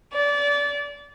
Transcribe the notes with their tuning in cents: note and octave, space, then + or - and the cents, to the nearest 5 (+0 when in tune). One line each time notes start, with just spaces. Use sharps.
D5 -25